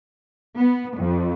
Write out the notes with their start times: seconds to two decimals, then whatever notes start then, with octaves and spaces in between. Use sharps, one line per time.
0.58 B3
0.97 F2